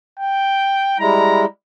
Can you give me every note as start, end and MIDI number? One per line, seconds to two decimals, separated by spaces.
0.20 0.97 79
0.99 1.45 55
0.99 1.45 56
0.99 1.45 64
0.99 1.45 82